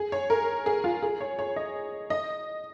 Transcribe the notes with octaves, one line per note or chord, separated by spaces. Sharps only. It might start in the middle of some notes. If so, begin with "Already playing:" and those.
Already playing: G#4
C#5
A#4
G#4
F4
G#4
C#5
C#5
D#5
D#5